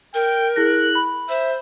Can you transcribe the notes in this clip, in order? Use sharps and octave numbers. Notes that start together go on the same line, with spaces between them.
A#4 G5
E4 G#4 F#6 A#6
B5
C5 E5